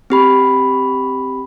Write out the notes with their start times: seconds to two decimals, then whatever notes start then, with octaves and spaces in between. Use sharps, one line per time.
0.10 C4 G4 B5